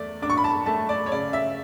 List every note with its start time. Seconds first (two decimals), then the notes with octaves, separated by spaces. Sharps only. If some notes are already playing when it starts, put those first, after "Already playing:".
Already playing: E2 A3 D5
0.22 D4 D6
0.30 C#6
0.38 B5
0.44 A5
0.66 A3 A5
0.89 D5
1.06 C#5
1.12 C#3 D5
1.33 E5